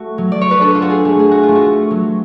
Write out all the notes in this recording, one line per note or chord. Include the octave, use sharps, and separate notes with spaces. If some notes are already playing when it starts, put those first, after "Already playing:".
Already playing: A3 F#4
F#3
D5
C#5
B4
D4 A4
F4
F#4
G#4
A3
G#4
F#4
F4
A3
F#4
F#3